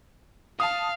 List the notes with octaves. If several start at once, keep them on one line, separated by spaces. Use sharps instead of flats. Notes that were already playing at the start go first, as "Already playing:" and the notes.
F5 A5 D#6